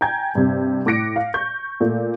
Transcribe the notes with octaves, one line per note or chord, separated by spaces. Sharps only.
G5 G#5 A#5 G6 G#6
G2 C3
A2 D6 F#6 A#6 C#7 D7
F5
C#6 G6
A#2 A3